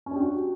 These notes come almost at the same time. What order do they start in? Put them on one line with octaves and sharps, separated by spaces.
C#4 D4 G4 F#4